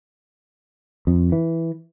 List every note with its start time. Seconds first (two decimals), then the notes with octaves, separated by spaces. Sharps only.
1.07 F2
1.32 E3